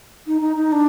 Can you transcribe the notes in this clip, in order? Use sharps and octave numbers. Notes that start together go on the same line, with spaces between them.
D#4
D#4
D#4
D4